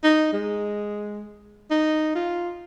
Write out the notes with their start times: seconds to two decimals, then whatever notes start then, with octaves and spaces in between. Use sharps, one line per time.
0.04 D#4
0.33 G#3
1.71 D#4
2.15 F4